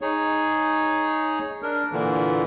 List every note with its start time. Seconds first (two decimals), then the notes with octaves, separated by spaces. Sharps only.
0.02 D#4 G#4 C#5
1.63 D4 A#4
1.92 A#2 D3 E3